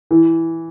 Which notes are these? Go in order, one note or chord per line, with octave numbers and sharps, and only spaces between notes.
E3